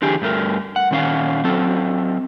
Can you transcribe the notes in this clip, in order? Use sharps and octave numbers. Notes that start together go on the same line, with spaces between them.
D3 E3 G4 G#4
G2 A3 A#4
F#5
A#2 D#3 C#4 C5 F5 F#5
F#3 C4 A4